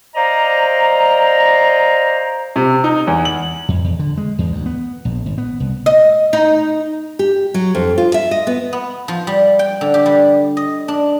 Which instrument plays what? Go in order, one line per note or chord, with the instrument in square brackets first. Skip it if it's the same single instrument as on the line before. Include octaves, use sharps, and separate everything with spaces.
[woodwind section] C5 D5 D#5 F5 A#5
[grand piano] C3
D#4
E2
F#7
[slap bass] F2
E2
D3
G#3
E2
D2
B3
A#1
G#1
B3
C2
[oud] D#5
D#4
[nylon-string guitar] G4
F#3
F2
F4
E5
D#5
B3
[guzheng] B3
F3
G3
G5
D3
G4
G3
D#5
D4